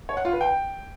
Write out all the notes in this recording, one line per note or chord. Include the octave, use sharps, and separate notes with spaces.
C#5
F#5
F4
B4
G5